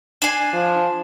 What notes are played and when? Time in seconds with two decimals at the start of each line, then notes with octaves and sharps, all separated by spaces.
0.22 D4 G#5 C7 E7
0.53 F3